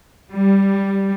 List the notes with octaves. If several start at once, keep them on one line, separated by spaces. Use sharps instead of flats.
G3